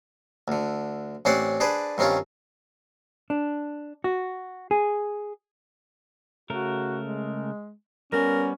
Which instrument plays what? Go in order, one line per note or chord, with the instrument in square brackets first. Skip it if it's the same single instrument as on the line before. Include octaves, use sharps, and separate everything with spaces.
[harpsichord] D2 D3
A1 C4 C#4 C5 D5 F#5
D4 G#4 B4 C5 D5
G2 D#3 C4 C#4 F4
[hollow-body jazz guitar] D4
F#4
G#4
[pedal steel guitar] C#3 A3 A#4 [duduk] F#4
[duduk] G#3
[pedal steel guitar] G3 B3 [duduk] C#4 [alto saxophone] A#4